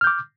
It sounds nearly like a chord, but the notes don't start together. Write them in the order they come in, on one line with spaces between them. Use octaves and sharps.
F6 G6 D6